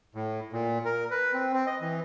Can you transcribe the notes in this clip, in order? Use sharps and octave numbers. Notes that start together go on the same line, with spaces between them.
A2
A#2
A#4
B4
C4
C4
D#5
E3